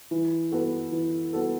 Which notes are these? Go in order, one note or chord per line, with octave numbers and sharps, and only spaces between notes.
E3
B3 F#4 A4
E3
B3 F#4 A4